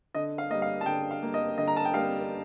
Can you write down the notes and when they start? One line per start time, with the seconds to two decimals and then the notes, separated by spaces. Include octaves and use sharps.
0.15 D3 D#5
0.38 F5
0.50 G3 A#3 D#5
0.62 F5
0.81 A5
0.86 D3 G5
1.11 F5
1.22 G3 A#3
1.34 D#5
1.58 D3 D#5
1.68 A#5
1.77 A5
1.85 G5
1.94 G3 A#3 F5